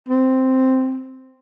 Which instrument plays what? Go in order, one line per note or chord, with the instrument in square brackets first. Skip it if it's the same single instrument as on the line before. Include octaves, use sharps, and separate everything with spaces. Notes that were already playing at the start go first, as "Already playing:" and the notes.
[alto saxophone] C4